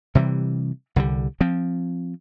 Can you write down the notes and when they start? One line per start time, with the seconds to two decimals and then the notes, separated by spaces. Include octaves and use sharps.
0.15 C3 E3 G3
0.96 C2 D3 F3 G3
1.41 F3 C4